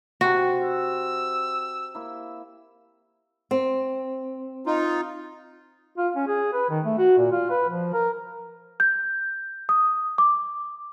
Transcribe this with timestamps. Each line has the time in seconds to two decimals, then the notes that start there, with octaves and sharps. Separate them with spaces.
0.21 C3 F#4 C5
0.62 E6
1.95 A#3 E4
3.51 C4
4.66 D#4 F4
5.98 F4
6.16 C#4
6.28 G#4
6.53 B4
6.69 D#3
6.84 A3
6.98 F#4
7.18 A#2
7.32 F4
7.50 B4
7.69 F3
7.93 A#4
8.80 G6
9.69 D#6
10.18 D6